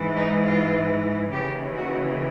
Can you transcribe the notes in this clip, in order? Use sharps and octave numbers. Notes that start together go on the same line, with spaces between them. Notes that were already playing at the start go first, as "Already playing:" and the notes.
Already playing: G#2 E3
D#4
F4
D#2 C#3 E3 G4
F#4